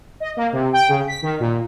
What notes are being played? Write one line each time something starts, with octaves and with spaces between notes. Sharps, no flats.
D#5
A#3
C3
G5
C#3
B6
D#3
A#2